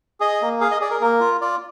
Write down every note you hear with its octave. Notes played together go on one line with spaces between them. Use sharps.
G#4 D#5
A#3
G#4 F5
D#5
G#4 D5
A#4
A#3 A#4
F4
F4 D5